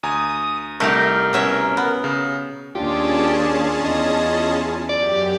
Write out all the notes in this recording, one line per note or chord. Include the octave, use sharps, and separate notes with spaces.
D2 G#5 A#5 D#6
C2 A3 D#4 G4 A#4
B2 C#4 E5
B3
C#3
D#2 C#4 D4 F4 G4 G#4 A5
E2 D#5
F#2 G4 D5